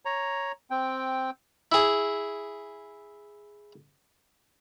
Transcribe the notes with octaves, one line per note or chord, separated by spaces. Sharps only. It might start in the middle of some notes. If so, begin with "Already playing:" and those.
C#5 A#5
C4 G5
E4 G#4